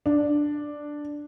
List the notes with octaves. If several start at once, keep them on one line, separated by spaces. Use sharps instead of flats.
D4